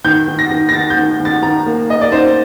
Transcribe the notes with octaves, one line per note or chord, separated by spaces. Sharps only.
D#3 G6
D#3
A#6
D#3
A#6
D#3 A6
G6
D#3
D#3
A6
D#3 A#5
A#3
A#3 D#5
D5
D#4 C5